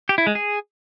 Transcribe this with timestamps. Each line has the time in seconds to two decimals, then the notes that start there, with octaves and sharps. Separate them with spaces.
0.09 G4
0.18 E4
0.27 G#3
0.35 G#4